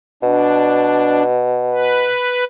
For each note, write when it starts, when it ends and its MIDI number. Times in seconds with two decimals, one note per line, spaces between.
0.23 2.11 47
0.23 1.23 62
1.70 2.44 71